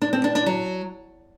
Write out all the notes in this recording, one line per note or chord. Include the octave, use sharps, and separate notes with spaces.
D4
C4
D4
D4
F#3